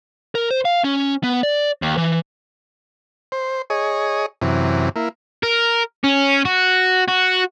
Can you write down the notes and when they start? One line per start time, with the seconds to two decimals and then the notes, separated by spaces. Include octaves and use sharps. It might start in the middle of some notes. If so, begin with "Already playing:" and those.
0.35 A#4
0.50 C5
0.65 F5
0.84 C#4
1.23 B3
1.43 D5
1.82 D#2
1.97 E3
3.32 C5
3.70 G#4 C#5 D#5
4.42 F#2 C3 E3
4.96 A#3 E4
5.43 A#4
6.04 C#4
6.45 F#4
7.08 F#4